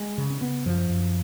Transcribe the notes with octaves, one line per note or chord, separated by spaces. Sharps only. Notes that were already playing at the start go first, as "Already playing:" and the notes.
Already playing: G#3
C#3
C#4
C#3 B3
F#2 F3
F#2